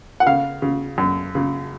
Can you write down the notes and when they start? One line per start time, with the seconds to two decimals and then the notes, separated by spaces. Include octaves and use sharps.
0.20 F#5
0.26 C#3 F5
0.62 C#3
0.98 F#2
1.35 C#3